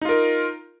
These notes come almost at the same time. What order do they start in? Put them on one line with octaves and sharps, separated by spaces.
D#4 F4 A#4